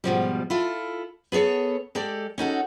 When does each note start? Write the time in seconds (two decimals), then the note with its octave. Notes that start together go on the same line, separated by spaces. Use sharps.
0.04 G#2 B2 F3 G3
0.50 E4 F4 A4
1.32 B3 G#4 A4 C#5
1.95 G#3 G4 A4 D5
2.38 C#4 D#4 F#4 A4